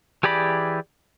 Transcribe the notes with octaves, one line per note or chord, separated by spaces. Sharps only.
E3 G4 G#4 D5 B5